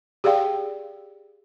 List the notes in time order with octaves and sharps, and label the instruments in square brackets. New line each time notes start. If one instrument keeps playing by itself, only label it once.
[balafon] G4 G#4 D5 F5 G5